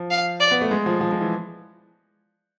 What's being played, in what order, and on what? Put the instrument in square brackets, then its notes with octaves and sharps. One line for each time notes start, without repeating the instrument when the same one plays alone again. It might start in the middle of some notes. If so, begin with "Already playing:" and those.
Already playing: [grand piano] F3
[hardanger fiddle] F5
D5
[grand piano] B3
A3
G#3
F3
F3
G#3
E3